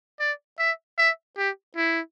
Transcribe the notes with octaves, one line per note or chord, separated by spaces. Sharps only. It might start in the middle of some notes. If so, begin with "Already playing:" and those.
D5
E5
E5
G4
E4